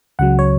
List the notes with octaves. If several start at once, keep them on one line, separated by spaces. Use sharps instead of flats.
C#2 C#3 F#3 F#5
C#5